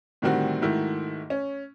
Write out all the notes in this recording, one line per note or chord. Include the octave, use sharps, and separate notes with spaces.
A2 D3 D#3 G3 C4 F#4
G#2 D#3 A3 E4 F#4
C#4